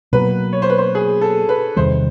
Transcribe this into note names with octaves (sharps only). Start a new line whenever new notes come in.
B2 F#3 A#3 B4
C#5
C5
B4
C5
G#4
A4
B4
E2 C3 D#3 G3 C5